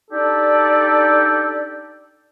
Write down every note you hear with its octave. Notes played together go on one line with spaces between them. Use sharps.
D4 D#4 G4 A4 D5